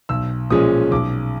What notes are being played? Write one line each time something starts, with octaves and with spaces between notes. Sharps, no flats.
B1 E6
A#2 F3 G#3 C#4 D#6
B1 D6